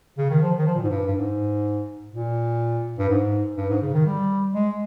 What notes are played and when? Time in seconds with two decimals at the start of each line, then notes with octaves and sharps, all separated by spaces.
0.18 C#3
0.30 D#3
0.42 F3
0.58 D#3
0.67 F3
0.75 A#2
0.83 G#2
0.90 G2
1.06 G2
1.15 G#2
2.12 A#2
2.99 G2
3.09 G#2
3.57 G2
3.69 G#2
3.82 C#3
3.94 D#3
4.06 G3
4.54 G#3